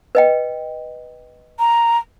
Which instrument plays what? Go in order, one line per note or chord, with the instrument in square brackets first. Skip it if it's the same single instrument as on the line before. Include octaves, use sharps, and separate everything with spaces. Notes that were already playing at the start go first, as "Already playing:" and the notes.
[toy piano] B4 D#5 G5
[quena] A#5